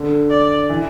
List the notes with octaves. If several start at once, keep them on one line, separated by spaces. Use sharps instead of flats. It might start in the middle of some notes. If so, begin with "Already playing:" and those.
Already playing: D3
D5
E3